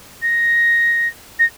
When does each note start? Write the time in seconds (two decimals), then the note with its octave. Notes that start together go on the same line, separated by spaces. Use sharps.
0.22 A#6
1.39 A#6